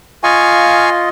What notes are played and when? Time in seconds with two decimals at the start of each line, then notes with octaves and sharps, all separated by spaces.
0.24 F4 D#5 F5 G#5 C#6